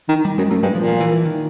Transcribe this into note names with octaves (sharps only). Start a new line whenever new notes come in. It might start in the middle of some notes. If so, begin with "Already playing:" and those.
D#3
G3
F#2 G#3
F#2 A3
G2 G#3
A#2 F3
F3
E3
E3
D#3